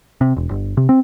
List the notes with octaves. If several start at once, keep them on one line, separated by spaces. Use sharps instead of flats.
C3
E1
G1
C3
C4